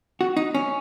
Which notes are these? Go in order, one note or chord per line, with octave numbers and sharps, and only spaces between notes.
F#4
D#4
C#4